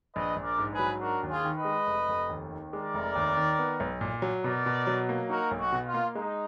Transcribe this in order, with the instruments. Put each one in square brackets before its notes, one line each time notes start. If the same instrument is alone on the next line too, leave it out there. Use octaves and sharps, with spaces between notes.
[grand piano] A#1 [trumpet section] B4 D#5
[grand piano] A#1
[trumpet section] A#4 D5
[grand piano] G#2
[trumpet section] G#4 B4
[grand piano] F#3
[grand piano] D4 [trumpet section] F#4 A#4
[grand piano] D#2
[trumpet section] F4 G#4
[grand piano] D#3
[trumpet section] B4 D#5
[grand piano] G#3
F1
F1
D#2
D#3
[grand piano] G#3 [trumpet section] A#4 D5
[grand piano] F1
D#2
D#3
B3
B1
A#2
F#3
[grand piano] B2 [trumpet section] A#4 D5
[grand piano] B2
F#3
A#3
[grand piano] D#4 [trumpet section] F#4 A#4
[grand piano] B1
[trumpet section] F#4
[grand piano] B2
[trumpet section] F4
[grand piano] A#3
[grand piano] G#3 [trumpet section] D#4